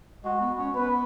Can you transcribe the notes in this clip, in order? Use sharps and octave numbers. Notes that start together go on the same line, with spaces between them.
G#3 F#4
B3
C#4
B3 B4